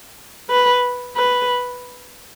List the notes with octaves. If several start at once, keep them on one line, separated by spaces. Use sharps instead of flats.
B4
B4